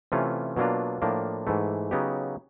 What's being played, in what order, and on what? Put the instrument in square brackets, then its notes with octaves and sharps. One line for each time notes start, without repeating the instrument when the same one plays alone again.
[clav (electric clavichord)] C3 E3 A3 C#4 F4
B2 F#3 A#3 D4 F4
A2 F3 A#3 D4
G#2 E3 A3
C#3 F#3 B3 D#4 G4